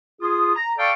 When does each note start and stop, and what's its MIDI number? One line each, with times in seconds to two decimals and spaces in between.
0.21 0.55 65
0.21 0.55 68
0.21 0.55 87
0.55 0.72 82
0.78 0.92 69
0.78 0.92 74
0.78 0.92 77
0.78 0.92 79
0.78 0.92 81
0.78 0.92 85